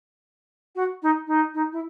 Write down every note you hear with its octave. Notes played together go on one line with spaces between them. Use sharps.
F#4
D#4
D#4
D#4
E4